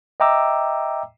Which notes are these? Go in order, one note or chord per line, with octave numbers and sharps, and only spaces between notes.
D#5 E5 G5 A#5 D6 E6